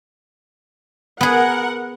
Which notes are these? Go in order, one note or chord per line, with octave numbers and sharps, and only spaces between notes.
B3 G#4 A#4 F#5